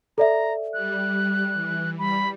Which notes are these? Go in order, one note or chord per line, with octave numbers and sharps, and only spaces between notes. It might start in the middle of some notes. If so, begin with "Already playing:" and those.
A4 D5 E5 A#5
G3 F#6
E3
G3 B5